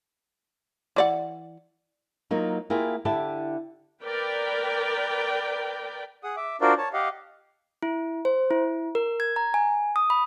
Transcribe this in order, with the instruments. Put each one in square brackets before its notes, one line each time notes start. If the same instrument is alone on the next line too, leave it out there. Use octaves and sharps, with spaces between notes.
[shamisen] E3 D5 F#5
[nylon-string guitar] F#3 A#3 D#4 F4
A#3 E4 F4 G4 G#4
D3 E4 G4 A5
[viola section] A#4 B4 D5 G5
[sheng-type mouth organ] G#4 F#5 D#6
E5 D6
D4 F4 F#4 A#4 C5 D5
C#5 A5
G4 D#5 F5 F#5
[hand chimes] E4
C5
E4
A#4
G#6
A#5
G#5
D#6
B5